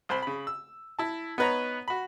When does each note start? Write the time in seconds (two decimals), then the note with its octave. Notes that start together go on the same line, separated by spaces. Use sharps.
0.09 C2 C5 B5
0.22 C#3 B5
0.47 E6
0.99 E4 A5
1.38 B3 D#4 B4 C#5 A#5
1.88 F#4 B5